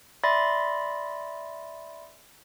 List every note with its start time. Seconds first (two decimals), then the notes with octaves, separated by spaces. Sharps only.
0.23 D5 E5 B5 C6 A6 A#6